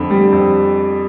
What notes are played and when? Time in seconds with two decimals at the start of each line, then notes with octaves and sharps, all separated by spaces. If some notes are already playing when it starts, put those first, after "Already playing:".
Already playing: F2 D3 B5
0.10 G3
0.32 F2